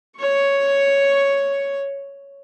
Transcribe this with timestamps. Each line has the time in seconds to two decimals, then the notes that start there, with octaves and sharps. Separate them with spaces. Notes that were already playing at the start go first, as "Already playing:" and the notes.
0.20 C#5 C#6